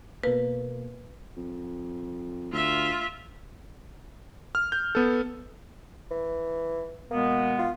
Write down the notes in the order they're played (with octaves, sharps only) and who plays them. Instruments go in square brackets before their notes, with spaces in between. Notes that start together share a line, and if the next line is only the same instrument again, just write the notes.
[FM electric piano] B2 A#3 [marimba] B4
[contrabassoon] F2
[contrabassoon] D2 [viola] F4 E5
[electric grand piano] F6
G6
B3 A4
[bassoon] E3
[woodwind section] B2 G#3 B3 [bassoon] A#3
[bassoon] F4